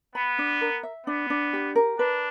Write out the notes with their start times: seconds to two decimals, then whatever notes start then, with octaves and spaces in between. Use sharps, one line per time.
0.15 B3 B5
0.38 D4
0.61 A#4
0.83 E5
1.06 B3 D4
1.30 D4
1.53 G4
1.75 A#4
1.99 D4 B4